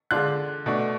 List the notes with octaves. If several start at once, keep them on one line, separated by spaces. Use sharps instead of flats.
D3 G#3 D4 F4 F#6
B2 A3 D4